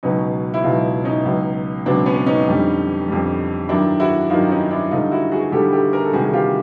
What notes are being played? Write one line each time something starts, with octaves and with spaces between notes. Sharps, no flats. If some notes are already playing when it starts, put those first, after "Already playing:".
C#2 B2 F#3 C#4 D#4
E4
C#2 B2 F#3 D#4 F4
C#4 D#4
C#2 B2 F#3
C#2 B2 F#3 C4 D4
B3 C#4
C#4 D#4
F2 D3 G3
F2 D3 G3
G2 D#3 F#3 D4 E4
E4 F#4
G2 D#3 F#3 D#4 F4
C#4 D#4
D4 E4
D2 D3 G3 D#4 F4
E4 F#4
F#4 G#4
D2 D3 G3 G4 A4
G4 A4
G#4 A#4
A4
D2 C3 D#3 G3 F#4 G#4
G#4
F4 G4